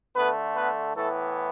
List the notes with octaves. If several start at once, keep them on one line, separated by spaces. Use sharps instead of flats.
D3 A3 B3 B4
B3 B4
A2 E3 A3 B3 A4